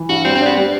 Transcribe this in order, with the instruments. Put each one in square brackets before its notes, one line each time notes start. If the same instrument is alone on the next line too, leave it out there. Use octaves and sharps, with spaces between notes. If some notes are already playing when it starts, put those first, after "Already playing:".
Already playing: [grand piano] E3
[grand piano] G2 [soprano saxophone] F#4
[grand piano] G3 [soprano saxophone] C4
[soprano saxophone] C4
[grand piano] D4
[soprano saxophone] B3
[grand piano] G3